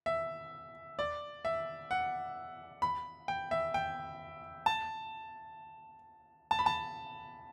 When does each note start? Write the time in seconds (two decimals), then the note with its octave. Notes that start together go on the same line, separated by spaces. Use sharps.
0.06 E5
0.99 D5
1.45 E5
1.91 F#5
2.82 B5
3.28 G5
3.51 E5
3.74 G5
4.66 A5
6.51 A5
6.59 B5
6.66 A5